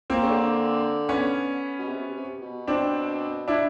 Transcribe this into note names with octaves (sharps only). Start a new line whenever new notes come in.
A#3 C4
C#3
D3
B3 C#4
B2
C3
C3
B2
C4 D4
D4 E4